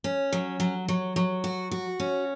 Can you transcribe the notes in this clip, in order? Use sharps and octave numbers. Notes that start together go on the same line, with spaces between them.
C#4
F#3
F#3
F#3
F#3
F#4
F#4
C#4